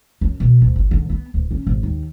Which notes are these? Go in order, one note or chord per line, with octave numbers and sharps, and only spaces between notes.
F#2
B2
D2
G1
D3
B3
D1
C#4
G#1
D#2